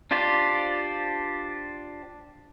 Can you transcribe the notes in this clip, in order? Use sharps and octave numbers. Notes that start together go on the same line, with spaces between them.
D4 F4 G4 C5 D5